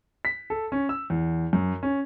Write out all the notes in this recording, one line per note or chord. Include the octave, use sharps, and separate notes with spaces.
B6
A4
C#4
E6
E2
F#2
C#4